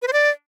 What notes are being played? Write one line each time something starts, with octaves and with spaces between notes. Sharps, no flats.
B4
C5
D5